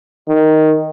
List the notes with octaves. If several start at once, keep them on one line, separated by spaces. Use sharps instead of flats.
D#3